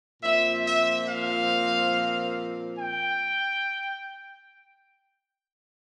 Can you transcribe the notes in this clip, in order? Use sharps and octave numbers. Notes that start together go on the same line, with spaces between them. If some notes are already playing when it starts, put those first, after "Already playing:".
A#2 F3 C4 E5
E5
F5
G5